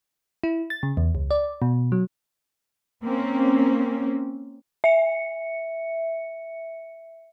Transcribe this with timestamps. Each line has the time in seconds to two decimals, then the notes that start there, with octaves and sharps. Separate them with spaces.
0.43 E4
0.70 A6
0.83 C#3
0.97 E2
1.15 C#2
1.31 D5
1.62 B2
1.92 F#3
3.04 A#3 C4 C#4
4.84 E5 C#7